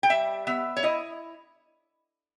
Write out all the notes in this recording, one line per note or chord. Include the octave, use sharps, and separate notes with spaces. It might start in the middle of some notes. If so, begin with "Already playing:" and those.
G5
G3 E5
B3 E5
C#5
E4 D#5